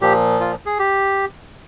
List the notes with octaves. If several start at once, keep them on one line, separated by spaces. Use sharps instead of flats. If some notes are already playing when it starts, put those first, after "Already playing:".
A#2 F3 G4
F4
G#4
G4